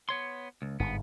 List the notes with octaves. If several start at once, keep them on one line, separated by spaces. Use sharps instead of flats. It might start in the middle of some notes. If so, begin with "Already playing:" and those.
B3 C#5 C6
C#2
G1 G#2 B3